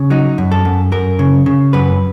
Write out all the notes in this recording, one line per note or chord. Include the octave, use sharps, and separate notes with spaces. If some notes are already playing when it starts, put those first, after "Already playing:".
Already playing: C#3
F#3 D#4
F#2
A4
F#2
F#2 A#4
C#3
C#3
F#2 B4